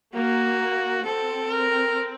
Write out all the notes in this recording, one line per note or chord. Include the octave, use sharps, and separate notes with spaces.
A#3 F#4
C4 A4
A#4